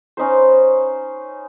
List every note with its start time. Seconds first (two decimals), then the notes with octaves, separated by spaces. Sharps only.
0.17 C#4 D#4 B4 C5